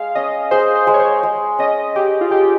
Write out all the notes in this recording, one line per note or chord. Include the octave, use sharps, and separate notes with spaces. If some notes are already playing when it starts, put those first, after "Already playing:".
Already playing: G#3 F5
C#4 D#5
G#4 C5
C5
G#3
C#5
C5
G#3
C#4 D#5
G4 G#4
F4
G#3 G4